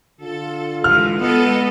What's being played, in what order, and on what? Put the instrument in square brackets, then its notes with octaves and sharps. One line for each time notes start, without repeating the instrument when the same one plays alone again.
[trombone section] D3 F4 [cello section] A4
[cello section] E3 G#3 [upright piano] F6
[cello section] G#3 A4 D#5 [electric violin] B3